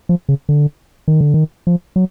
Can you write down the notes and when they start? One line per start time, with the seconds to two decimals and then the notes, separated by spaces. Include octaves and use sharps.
0.09 F3
0.29 C#3
0.49 D3
1.08 D#3
1.21 D3
1.34 D#3
1.67 F3
1.96 F#3